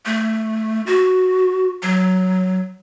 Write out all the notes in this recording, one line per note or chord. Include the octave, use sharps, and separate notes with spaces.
A3
F#4
F#3